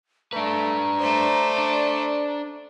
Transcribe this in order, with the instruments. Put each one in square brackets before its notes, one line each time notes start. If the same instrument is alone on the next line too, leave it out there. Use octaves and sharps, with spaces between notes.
[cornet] A3 [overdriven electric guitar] D4 B4 [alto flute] A#5
[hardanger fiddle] A3 C5 [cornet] D5
[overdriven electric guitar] D4